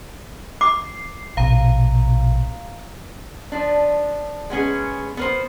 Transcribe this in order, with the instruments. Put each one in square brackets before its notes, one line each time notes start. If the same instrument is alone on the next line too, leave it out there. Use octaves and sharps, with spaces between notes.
[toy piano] D6 [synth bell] C7
[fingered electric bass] A#1 B2 [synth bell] F5 A#5
[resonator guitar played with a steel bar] F3 D4
G#3 B3 C#4 G#4
B3 A#4 C5